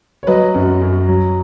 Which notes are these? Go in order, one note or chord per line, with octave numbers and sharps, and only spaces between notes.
C#5
F#3 B4 D#5
F#2
F#2
F#3